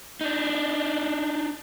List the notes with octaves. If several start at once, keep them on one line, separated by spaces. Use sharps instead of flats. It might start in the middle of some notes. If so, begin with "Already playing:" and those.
D4 D#4